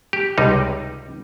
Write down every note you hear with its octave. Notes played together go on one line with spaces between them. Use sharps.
G4
C#2 C3 G3 D#4